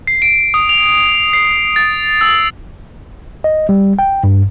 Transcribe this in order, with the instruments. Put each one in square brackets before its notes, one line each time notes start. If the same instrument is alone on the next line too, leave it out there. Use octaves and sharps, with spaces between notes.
[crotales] C7
D7
D#6
F7
C7
A6
E6
[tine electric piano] D#5
G3
G5
G2